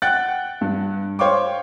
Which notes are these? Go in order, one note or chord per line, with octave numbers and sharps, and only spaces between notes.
F#5 G5 F#6 A6
G2
C5 C#5 F5 G5 C#6 D6